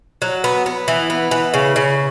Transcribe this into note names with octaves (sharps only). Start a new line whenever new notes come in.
F#3
B3
B3
E3
B3
E3
C#3
C#3